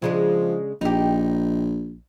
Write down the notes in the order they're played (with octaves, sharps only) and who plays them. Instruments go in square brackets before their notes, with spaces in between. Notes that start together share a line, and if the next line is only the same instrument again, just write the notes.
[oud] C#3 G#3 D4 [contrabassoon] F3
[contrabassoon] A#1 [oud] D#4 G4